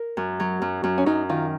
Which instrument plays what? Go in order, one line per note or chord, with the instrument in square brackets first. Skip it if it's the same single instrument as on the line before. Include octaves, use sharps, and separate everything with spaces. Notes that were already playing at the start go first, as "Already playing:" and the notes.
Already playing: [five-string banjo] A#4
[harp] F#2
F#3
F#2
F#2
[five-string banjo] C#4
[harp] F#2 [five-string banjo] D#4
[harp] D#3 [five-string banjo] F4